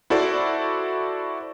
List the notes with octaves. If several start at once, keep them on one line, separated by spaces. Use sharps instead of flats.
E4 F#4 A4 C5 D5